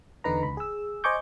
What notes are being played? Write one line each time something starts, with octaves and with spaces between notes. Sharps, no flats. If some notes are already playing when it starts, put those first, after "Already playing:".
E2 D3 D#4 B4 A#5
C#2 B5
G#4 E6
C5 D#5 G#5 C#6 D6 G6